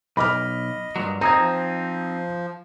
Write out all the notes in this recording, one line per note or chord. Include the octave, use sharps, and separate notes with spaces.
B1 D#5 B5 D6 F6
G2 A#2 F#3
C4 D#4 A#5 D#6 G#6
F3